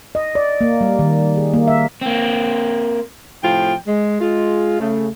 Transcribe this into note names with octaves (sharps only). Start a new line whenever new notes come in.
D#5
D5
A#3
G3
D#3
G#4
A#3
E5
A#3 C4
A2 C3 F3 F4 G5
G#3
G#3 F4
C#3 A3